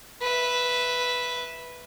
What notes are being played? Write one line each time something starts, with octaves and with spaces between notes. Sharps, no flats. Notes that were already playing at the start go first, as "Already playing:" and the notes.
B4 E5